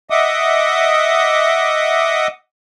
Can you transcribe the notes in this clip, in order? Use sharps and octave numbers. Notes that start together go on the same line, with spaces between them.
D#5 E5 F#5 D6 D#6